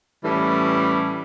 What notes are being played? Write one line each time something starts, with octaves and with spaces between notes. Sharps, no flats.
A2 E3 G3 C#4